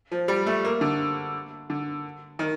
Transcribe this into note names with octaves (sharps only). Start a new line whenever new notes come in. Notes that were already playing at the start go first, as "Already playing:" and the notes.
F3
G3
A3
A#3
D3
D3
D#3